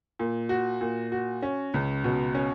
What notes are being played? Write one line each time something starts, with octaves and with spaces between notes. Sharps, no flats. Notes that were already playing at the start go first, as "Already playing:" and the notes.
A#2
F#4
A#2
F#4
C#4
C#2
B2
C#4